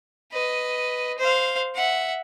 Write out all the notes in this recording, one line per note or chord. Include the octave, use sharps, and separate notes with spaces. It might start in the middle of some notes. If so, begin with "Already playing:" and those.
B4 D#5
C5 F5
E5 F#5